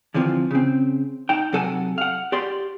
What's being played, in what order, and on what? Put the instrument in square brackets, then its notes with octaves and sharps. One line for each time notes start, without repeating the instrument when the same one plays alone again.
[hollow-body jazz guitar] D3 E3 F3 C4 F4
C#3 C4
D#4 G5
C3 F#3 A4 F#5 G#5
F5 F#5
G4 D5 C6